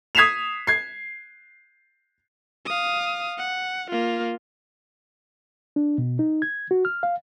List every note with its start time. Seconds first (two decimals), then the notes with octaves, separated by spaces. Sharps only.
0.15 D#6 G#6 B6 C7 E7 F7
0.67 G#6 C7
2.66 F5 D#6
3.38 F#5
3.90 A#3 F4
5.76 D4
5.98 B2
6.19 D#4
6.42 G#6
6.71 F#4
6.85 F6
7.03 F5